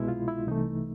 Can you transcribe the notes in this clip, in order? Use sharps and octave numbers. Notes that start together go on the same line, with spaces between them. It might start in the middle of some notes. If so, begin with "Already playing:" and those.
Already playing: C2 B2 G#3 E4
F4
E4
C2 C3 E3 A3 D#4